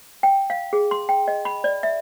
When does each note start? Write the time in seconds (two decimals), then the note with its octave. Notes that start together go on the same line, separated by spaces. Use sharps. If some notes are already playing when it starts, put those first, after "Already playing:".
0.23 G5
0.50 F5
0.73 G#4
0.91 C6
1.09 G5
1.28 D#5
1.45 B5
1.64 D5
1.83 E5